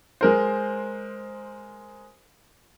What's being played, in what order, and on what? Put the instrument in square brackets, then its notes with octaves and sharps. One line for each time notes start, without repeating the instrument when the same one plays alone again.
[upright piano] G#3 A#4 C5